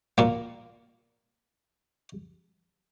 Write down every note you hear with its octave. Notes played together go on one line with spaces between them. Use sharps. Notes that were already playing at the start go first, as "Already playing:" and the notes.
A#2 A#3